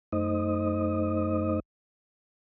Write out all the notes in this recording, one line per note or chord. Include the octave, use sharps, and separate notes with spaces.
F#2 A3 D#4 C5 D#5 D#6